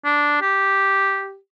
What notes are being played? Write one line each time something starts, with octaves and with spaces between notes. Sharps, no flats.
D4
G4